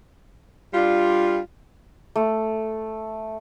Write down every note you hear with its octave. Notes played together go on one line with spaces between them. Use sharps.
G3 D4 F4
A3